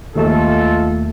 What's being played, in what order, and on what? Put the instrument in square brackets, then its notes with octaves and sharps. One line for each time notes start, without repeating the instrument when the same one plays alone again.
[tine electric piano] D#2 A3 A5 [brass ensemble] G#3 F4 A4